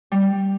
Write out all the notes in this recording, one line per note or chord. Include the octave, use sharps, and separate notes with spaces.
G3